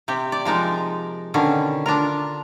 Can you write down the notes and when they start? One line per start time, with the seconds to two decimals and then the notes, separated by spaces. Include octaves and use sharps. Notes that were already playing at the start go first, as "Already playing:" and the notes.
0.08 C3 C4 G4
0.32 D5
0.45 F3 G#3 D#4 A#4
1.34 B2 D3 D#3 C#4
1.86 D4 F4 A#4